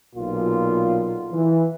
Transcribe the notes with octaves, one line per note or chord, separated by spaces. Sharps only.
B1 A#2 F4
E3